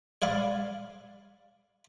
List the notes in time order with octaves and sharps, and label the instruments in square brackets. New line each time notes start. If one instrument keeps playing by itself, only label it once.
[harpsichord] C#5 D5 F5 B5